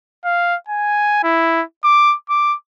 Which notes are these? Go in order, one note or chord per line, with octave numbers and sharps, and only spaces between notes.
F5
G#5
E4
D6
D6